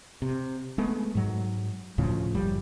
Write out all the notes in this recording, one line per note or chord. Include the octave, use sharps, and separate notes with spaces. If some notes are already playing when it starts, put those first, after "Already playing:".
C3
G#3 A3 B3
G#2 F#3
D2 A2 C#3 F3
F#1 F3 G3